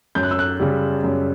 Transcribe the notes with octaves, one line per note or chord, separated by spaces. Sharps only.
F#2 G6
F#6
E6
F#6
C#3 G3
F#2